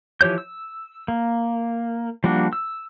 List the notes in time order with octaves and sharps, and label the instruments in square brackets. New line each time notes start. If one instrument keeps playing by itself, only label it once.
[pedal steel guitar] E3 F3 G4 C#5 G6
E6
A#3
F3 G3 A#3 D4 F#4
E6